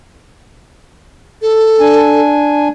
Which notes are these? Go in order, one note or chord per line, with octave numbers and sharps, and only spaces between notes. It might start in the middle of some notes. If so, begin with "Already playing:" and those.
A4
D4 G#5